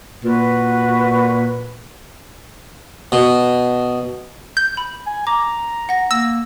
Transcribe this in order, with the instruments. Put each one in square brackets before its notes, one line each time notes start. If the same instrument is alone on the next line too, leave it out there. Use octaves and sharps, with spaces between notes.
[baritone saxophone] A#2 [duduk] F#4 [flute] B4
[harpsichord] B2
[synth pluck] G6
[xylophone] B5
[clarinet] G#5
[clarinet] A#5 [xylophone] D6
[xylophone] F#5 A#6
[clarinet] A#3 [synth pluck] E6 [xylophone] A#6